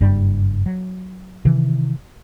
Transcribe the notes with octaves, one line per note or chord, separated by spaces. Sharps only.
F#1 G2 G3
F#3
C3 D#3 E3